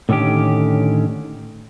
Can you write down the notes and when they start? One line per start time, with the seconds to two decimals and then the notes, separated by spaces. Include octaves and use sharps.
0.09 A2 D3 D#3 C#4 G4